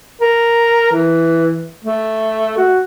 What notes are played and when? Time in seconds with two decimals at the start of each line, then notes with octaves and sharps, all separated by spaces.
0.21 A#4
0.93 E3
1.84 A3
2.57 F#4